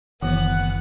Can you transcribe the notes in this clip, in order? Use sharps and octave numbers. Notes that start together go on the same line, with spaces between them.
F#1 D#3 E3 B3 F#5